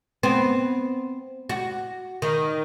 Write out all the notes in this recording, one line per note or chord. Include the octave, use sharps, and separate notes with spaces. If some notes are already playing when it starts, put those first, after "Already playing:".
B3 C4
F#4
D#3